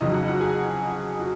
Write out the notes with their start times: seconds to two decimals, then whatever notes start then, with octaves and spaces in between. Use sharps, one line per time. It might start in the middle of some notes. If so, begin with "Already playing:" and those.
0.01 F2 C#3 F#3 D#4 D#5
0.14 F#4 F#5
0.27 F#4 F#5
0.41 G#4 G#5
1.19 F#4